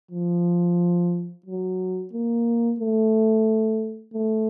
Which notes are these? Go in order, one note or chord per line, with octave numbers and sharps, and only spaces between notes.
F3
F#3
A#3
A3
A3